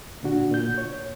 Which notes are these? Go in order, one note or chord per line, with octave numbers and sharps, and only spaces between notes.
A#2 D3 D4 F#4
A#2 G6
C#5